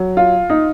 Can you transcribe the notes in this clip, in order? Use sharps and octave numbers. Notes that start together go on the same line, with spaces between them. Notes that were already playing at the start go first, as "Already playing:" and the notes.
Already playing: F#3
F4
D#4